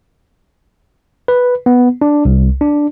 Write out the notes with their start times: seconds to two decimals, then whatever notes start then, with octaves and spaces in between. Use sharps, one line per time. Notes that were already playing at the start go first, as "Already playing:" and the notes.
1.28 B4
1.66 B3
2.01 D4
2.25 C2
2.61 D4